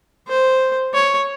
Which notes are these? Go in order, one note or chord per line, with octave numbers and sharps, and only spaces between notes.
C5
C#5